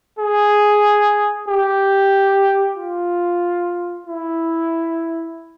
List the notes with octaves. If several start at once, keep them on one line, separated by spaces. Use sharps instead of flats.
G#4
G4
F4
E4